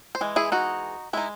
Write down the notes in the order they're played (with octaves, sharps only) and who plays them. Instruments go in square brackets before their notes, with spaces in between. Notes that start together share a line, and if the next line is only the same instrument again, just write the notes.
[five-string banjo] C5
E3 G#3
E4 G#4
D#4 F#4
G#3 D#4 E4